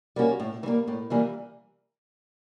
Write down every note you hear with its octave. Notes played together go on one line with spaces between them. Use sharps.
G3 A#3 C#4 F#4
A2
E3
G3 A#3
A2
E3 G3 A#3